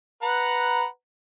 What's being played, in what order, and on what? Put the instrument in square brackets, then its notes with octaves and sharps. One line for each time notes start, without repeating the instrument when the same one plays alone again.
[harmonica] B4 F#5 A#5